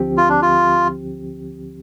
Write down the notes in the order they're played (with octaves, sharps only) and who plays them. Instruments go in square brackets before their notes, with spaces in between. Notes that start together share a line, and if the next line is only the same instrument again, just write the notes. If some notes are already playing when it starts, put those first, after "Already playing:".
Already playing: [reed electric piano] D2 D3 F3 C4 G4
[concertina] F4
D4
F4